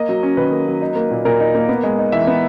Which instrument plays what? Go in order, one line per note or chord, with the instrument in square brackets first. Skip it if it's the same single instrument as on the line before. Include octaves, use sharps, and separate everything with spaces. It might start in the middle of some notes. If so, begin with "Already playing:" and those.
Already playing: [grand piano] A#3 D#5
F#3
C#4
D#3 B4
A#3
F#3
D#4
A#3
A#2
A#2 A#4
D#4
A#3
B3
G#3
D#4
E3 E5
B3